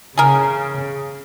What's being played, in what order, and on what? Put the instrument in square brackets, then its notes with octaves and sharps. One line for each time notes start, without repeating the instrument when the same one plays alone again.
[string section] C#3 [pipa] G#4 A#4